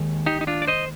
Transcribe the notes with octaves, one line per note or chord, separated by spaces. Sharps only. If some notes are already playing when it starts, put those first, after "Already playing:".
Already playing: D#2 D#3 G#3
D#4 G4
D#4
D4 F4
D5
C5 D#5